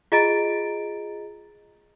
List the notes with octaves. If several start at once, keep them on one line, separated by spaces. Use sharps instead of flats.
F4 G#4 D#5 A#5 A6 D7